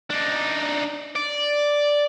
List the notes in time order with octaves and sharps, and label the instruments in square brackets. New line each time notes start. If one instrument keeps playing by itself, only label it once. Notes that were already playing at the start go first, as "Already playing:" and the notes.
[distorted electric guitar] D4 D#4
D5